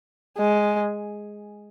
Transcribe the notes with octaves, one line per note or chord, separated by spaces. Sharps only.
G#3